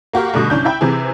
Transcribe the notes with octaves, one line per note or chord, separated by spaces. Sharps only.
A#3 F#4 G4 A#4
B2 D3 G3 A3
C2 C#4 D4 G6
E4 E5 G5 B5
C3 E3 C4 G#4